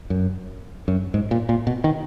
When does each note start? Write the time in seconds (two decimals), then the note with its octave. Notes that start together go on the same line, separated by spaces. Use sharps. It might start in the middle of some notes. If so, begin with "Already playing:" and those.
0.10 F#2
0.88 F#2
1.14 G#2
1.31 A#2
1.49 A#2
1.67 B2
1.84 D#3